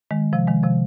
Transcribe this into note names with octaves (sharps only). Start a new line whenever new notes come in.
D#3 G#3
C3 F3
D#3 G#3
C3 F3